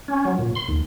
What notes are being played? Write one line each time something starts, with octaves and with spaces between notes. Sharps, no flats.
C#4
F#3
A#2
C6
D#2